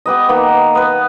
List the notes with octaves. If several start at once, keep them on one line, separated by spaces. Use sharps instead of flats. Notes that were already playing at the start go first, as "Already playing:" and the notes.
B3 G4 B4 D#5
D#3 A#3 B3
B3 B4